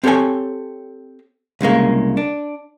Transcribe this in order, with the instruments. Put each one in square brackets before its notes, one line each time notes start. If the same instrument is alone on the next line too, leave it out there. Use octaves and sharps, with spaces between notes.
[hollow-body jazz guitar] C4 G4 A4 C#5 G#5
C2 C#3 G#3 A#3
D4